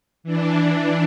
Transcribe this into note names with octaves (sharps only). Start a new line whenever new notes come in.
E3 D4